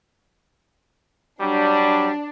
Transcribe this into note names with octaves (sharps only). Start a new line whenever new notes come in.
F#3 G3 D4